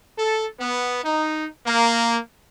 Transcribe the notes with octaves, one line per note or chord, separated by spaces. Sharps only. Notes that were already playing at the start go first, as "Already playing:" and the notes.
A4
B3
D#4
A#3